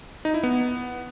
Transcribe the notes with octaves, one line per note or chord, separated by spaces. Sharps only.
D#4
E4
B3